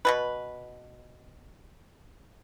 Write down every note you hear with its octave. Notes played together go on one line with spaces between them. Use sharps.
B2 G3 B4